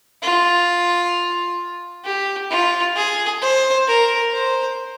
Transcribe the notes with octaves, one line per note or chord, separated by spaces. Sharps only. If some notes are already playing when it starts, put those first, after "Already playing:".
F4
G4
F4
G#4
C5
A#4
C5